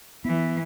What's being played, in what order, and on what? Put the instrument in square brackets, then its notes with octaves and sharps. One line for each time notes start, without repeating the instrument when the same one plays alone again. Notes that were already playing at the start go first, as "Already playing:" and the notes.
[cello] E3 [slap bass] B3